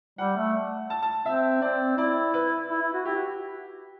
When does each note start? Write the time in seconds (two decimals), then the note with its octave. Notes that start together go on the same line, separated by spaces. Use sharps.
0.18 G3 F#5
0.37 A3
0.90 A5
1.02 A5
1.26 C4 E5
1.62 C4 D5
1.97 E4 D5
2.34 B4
2.70 E4
2.82 E4
2.94 F#4
3.05 E4 G4
3.15 F#4